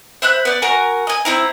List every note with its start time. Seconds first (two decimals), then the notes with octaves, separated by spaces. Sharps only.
0.22 C5 E5 B5 F#6
0.45 B3 D5
0.62 F#4 A#4 G#5 A#5
1.07 D#5 G#5
1.25 C4 E4 A#5